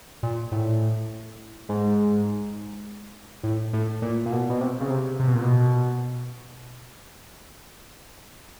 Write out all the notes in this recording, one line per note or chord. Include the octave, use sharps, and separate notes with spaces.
A#2
A2
G#2
A2
A2
A#2
A#2
B2
B2
C3
C#3
C3
C3
B2
A#2
B2